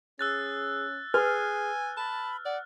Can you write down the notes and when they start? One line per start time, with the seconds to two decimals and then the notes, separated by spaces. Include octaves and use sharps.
0.19 C#4 G#4 E6 F#6 A6
1.14 G#4 B4 G#5 F6
1.97 A5 B5
2.45 D5 F#5